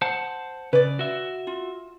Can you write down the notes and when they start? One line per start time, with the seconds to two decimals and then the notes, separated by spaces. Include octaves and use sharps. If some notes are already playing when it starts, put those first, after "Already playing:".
0.02 C5 F#5 A5
0.73 C#3 B4 D5
0.99 F#4 E5
1.47 F4